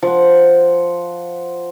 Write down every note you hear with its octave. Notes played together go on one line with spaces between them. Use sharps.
F3 F#5